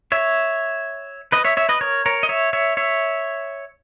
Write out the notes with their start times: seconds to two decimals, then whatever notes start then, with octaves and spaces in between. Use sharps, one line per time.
0.12 C#5 E5
1.32 B4 D#5
1.45 C#5 E5
1.57 C#5 E5
1.69 B4 D#5
1.81 A#4 C#5
2.06 A#4 C#5
2.23 D#5
2.29 C#5 E5
2.53 C#5 E5
2.77 C#5 E5